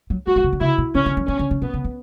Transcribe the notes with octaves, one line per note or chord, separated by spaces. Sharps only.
F#3
G3 F#4
A3
C#3
D3
C#3 E4
B2
C#3 C#4
D3
F#3
E3 C#4
D3
C#3
B2 B3
C#3
E3